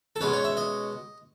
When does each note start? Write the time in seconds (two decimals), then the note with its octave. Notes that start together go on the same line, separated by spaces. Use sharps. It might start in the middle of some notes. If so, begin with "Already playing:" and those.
0.16 A4
0.21 B2 G#3 C#4 B4
0.33 C#5
0.44 E5
0.57 D#5